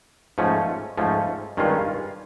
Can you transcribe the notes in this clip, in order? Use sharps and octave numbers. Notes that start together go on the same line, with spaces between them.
G#2 F3 A3 C#4
G#2 F3 A3 C#4
G2 D#3 G#3 C#4 F4